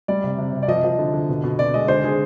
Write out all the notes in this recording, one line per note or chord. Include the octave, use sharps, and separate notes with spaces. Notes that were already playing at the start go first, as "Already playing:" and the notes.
G3 D5
C3
C3
C3
D5
F3 D#5
F3
D3
D3
B2
B2
B2 D5
G#3 D#5
D3 C5
D3 G#4